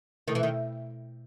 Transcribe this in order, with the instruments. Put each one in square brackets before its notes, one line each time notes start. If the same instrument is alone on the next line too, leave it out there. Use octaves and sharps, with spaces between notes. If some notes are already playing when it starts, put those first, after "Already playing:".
[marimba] B2 A3 E4 A4 [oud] D#3
[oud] E3
D#3